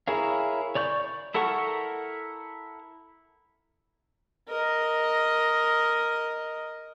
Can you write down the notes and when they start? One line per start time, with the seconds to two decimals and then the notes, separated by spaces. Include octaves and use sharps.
0.08 E4 G#4 A#4 C#5 F5
0.75 C#5 D5 C#6 G6
1.34 E4 A4 A#4 F#5 C#6
4.49 A#4 D#5